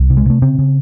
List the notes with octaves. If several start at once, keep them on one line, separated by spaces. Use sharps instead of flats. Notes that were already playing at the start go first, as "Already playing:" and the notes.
Already playing: C2
C3
G#3
C3 A3
C#3 C4
C#3